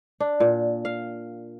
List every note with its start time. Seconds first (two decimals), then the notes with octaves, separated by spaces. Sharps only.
0.20 D4
0.40 A#2
0.85 F5